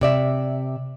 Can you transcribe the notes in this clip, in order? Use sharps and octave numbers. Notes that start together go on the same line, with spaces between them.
C3 D5 E5